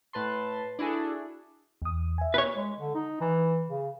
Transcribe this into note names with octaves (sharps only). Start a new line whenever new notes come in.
A2 B4 A5 C6
D4 E4 F#4 G#4 A4
E2 D#6
E5 G#5
B4 C#5
G#3
D3
D#4
E3
C#3